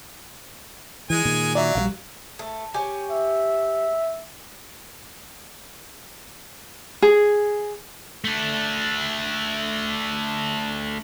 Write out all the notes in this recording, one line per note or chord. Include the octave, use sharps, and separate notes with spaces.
E3 G#3 G#5
A#2 D#3
F#3 D5 E5
A#1 C#3 G3 F5
A3
G4 C#5 G#5
E5
G#4
A3 D4